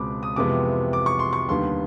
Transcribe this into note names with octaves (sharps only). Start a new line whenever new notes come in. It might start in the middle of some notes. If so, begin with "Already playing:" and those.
Already playing: C#2 B2 G#3 C4 B5 D6
D#6
F2 C3 E3 G#3 B3 D6
D6
C#6
C6
C#6
D#2 D3 G3 B3 C6